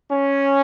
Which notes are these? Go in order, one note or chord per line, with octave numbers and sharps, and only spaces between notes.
C#4